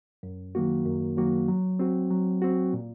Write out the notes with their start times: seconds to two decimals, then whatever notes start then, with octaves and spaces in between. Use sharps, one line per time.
0.23 F#2
0.55 D#3 F#3 A#3 F#4
0.86 F#2
1.17 D#3 F#3 A#3 F#4
1.48 F#3
1.79 C4 F#4
2.11 F#3
2.42 C4 F#4
2.73 A#2